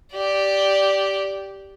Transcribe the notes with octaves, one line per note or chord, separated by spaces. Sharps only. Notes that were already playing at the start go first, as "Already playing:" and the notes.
G4 D5